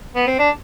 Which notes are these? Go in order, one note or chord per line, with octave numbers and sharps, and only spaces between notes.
B3
C4
D4